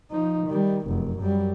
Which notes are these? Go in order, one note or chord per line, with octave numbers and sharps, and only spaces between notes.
F3 D#4
D#3 G3
F1 F#2
F#2 G3